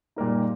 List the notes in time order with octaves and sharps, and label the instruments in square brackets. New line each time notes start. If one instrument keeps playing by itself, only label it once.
[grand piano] A#2 G3 A#3 D#4